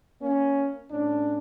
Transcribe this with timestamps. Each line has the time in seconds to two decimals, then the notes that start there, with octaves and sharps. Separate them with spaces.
0.21 A#3 C#4
0.90 A2 C#4 D4